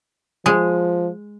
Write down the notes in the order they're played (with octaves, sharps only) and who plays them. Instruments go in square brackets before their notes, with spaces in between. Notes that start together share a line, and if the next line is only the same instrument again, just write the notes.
[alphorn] F3 [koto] G#3